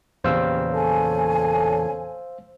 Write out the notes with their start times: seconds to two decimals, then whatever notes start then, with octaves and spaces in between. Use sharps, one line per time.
0.24 E2 A#2 C#3 G4 C5 F5 E6
0.74 A4 C#5 G#5